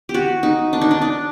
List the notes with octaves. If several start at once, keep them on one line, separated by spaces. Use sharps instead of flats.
G4
F#4
D#4
D4
D#4
D4
D4